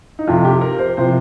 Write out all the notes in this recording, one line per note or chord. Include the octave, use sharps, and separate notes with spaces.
D#4
F2 C3 F3 F4
G4
A#4
C5
C3 F3 C5